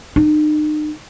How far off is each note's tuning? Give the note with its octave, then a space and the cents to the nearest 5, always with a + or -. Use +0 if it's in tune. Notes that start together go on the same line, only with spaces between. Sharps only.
D#4 -40